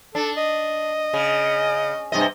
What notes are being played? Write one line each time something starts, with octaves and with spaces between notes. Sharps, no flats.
D4 A4
D#5
C#3
G2 C3 D#5